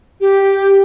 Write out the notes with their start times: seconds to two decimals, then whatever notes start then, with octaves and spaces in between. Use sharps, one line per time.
0.20 G4